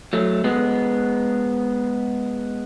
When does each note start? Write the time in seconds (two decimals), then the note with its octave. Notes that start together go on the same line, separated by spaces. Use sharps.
0.13 F#3 A3
0.44 G#3 B3